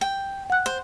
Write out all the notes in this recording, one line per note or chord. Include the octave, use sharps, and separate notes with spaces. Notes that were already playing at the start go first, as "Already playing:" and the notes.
G5
F#5 F#6
C5